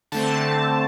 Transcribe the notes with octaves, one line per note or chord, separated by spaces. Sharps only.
D3 A3 C4 A5